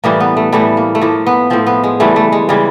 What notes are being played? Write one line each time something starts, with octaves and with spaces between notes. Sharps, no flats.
A2 E3 G3 A#3
B3
A3
A2 E3 G3 A3
A#3
A3
A2 F3 A#3
B3
A2 F3 C4
B3
G#3
C#3 E3 G3 A3
A3
G#3
C#3 E3 G3